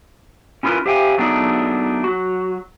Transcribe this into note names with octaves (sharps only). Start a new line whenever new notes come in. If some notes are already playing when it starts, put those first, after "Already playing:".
C#4 E4 F4 G#4 A#4 B4
G4 C5 E5 F5 G5 G#5
F#3 A3 B3 D4 D#4 G#4
F#3 F#4